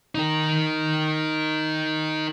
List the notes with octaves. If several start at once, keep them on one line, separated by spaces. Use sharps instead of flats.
D#4 A#4